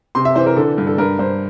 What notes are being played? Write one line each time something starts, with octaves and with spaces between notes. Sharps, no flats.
C3 C6
E5
E3 C5
A#4
D3 A4
G2
A4
G2 A#4
G2 C5